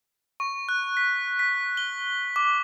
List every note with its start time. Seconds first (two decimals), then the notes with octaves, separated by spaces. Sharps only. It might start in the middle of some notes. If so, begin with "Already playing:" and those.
0.40 C#6
0.69 F#6
0.97 B6
1.39 B6
1.77 G7
2.36 D6